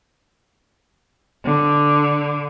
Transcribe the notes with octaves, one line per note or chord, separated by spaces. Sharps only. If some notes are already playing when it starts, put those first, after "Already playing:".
D3